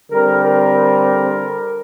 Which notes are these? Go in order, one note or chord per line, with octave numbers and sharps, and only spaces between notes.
D3 G3 C4 A#4
A#4